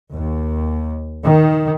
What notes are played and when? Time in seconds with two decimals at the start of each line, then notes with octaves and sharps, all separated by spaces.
0.12 D#2
1.23 D#3